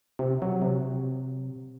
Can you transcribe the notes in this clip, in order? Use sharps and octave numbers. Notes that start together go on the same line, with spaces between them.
C3
F#3
C3